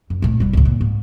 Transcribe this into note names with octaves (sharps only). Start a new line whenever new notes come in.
F#2
A#2 A3
F1 G3
C#2 A2
A#2
G#2